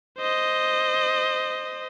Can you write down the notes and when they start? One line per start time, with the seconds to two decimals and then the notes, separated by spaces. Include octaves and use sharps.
0.19 C5 D#5